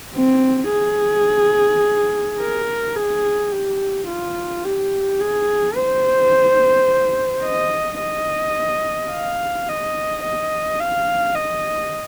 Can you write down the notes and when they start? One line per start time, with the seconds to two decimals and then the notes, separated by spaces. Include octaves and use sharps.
0.16 C4
0.72 G#4
2.40 A#4
2.96 G#4
3.52 G4
4.08 F4
4.64 G4
5.20 G#4
5.76 C5
7.43 D#5
7.99 D#5
9.11 F5
9.68 D#5
10.24 D#5
10.79 F5
11.35 D#5